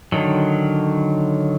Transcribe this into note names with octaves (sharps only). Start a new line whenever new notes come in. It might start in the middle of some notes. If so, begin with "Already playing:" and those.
D3 D#3 F#3